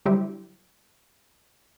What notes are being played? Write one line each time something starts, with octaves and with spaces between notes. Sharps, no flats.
D3 F#3 G3 E4 G4 C5